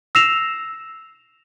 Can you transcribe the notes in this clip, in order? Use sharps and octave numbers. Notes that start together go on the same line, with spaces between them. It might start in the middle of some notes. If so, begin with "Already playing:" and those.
E6 A#6 C7 E7 F7